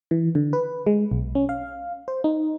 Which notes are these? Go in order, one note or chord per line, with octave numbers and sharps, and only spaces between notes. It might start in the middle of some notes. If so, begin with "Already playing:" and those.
E3
D3
B4
G#3
B1
C#4
F5
C5
D#4